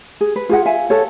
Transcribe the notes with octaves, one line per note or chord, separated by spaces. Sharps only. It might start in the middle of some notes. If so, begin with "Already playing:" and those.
G#4
B4
F4 G#4 F#5
E5 F5 G#5
A4 C#5